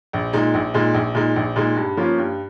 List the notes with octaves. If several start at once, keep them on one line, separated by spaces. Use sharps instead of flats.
A#1
A#2 G#3 D#4
A#1
A#2 G#3 D#4
A#1
A#2 G#3 D#4
A#1
A#2 G#3 D#4
G2
F3 A#3 C#4 F4
G2